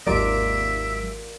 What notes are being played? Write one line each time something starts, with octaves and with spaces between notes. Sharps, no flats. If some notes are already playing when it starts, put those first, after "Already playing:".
G#1 D#2 F#3 F4 A#4 D5 E5 D7